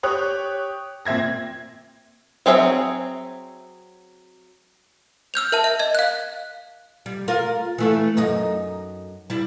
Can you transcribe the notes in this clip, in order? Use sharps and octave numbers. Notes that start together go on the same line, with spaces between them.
G4 C#5 D#6 F#6
A#2 C4 E5 G#6 A#6
F#3 C4 G#4 E5
E6 F6 G6 F7
A#4 E5 A5
E5
D#5 G#6
F5 F#6
G3
F4 A#4
E3 A3
F#2 D#4 D#5
G3 E4